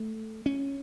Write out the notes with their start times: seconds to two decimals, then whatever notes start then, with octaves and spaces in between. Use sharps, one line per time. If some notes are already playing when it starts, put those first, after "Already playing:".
Already playing: A3
0.46 C#4